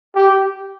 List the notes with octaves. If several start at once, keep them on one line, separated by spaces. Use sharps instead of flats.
G4